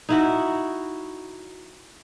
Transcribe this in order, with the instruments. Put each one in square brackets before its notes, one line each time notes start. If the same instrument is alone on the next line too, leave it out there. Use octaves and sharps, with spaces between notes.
[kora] D#4 E4 F#4